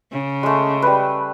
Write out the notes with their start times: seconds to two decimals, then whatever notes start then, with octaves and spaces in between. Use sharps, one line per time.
0.12 C#3
0.43 G#3 A3
0.82 G3 B4